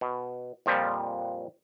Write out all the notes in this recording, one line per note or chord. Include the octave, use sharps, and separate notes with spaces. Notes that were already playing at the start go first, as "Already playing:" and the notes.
B2
F2 A#2 F3 G3